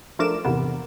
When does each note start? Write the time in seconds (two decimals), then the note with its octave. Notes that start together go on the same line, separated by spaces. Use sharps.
0.19 F3 A3 D4 A#4 D6 E7
0.45 E2 G#2 C3 A#3 B3